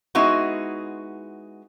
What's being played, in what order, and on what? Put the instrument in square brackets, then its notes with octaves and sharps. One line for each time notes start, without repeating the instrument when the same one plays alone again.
[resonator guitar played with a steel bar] G#3 B3 D#4 E4 F#4